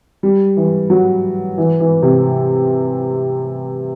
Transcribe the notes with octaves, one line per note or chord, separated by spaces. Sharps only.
G3
E3
F#3
E3
E3
C3